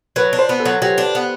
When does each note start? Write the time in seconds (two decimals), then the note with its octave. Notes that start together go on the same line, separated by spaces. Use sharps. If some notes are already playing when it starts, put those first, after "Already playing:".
0.16 F#3 B4
0.33 D4
0.39 C5
0.49 B3
0.60 A4
0.65 F#3
0.82 F#3 G4
0.98 D4
1.15 B3